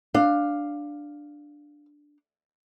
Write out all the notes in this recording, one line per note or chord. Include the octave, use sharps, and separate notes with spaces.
D4 F5